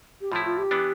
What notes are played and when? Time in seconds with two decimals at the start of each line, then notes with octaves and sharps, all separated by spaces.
0.21 G4
0.32 A2 F3 A3 E4 F4
0.45 F4
0.58 G4
0.71 E3 B3 D4